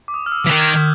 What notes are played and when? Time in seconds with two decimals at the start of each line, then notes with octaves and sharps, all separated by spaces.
0.08 D6
0.14 D#6
0.26 F6
0.32 E6
0.46 E3
0.50 D#3 F#6
0.60 G#6
0.68 G6